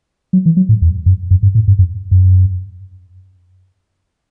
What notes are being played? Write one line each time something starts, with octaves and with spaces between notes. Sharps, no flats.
F#3
E3
F#3
A2
E2
F#2
F#2
G2
A2
G2
F#2
F#2